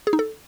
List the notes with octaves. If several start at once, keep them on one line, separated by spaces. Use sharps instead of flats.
G#4
D#4
A4